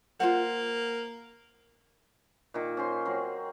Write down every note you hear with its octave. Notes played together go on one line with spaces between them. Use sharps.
A#3 F4 C5 F#5
A#2 D#3
C#4 C5 C6
F#3 C4